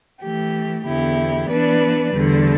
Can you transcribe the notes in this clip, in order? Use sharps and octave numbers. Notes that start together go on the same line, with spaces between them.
E3 A3 G4
E2 D3 B3 E4 G4
E3 B3 D4 B4 D5
E2 D3 G3